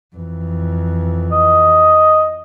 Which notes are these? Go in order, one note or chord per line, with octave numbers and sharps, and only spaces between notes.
F2 E3
D#5